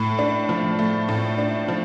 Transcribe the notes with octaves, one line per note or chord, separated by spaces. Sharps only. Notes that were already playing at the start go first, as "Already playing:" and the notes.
Already playing: A2
D4
F3
A3
A2
D4
F3